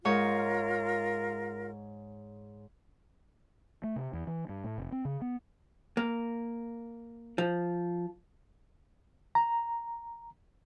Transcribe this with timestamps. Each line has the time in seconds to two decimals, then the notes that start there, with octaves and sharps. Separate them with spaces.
0.05 G#2 F4 A#4 C#5
3.84 A3
3.96 C3
4.13 E2
4.27 E3
4.49 G2
4.64 A2
4.78 F1
4.92 C4
5.05 C#3
5.22 B3
5.97 A#3
7.38 F3
9.35 A#5